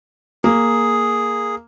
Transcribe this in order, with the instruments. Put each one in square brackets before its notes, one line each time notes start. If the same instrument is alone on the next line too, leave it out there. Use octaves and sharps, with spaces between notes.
[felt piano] A#3 [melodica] G#4